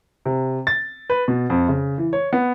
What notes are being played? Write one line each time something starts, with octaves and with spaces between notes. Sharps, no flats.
C3
A6
B4
B2
F2
C#3
E3
C#5
B3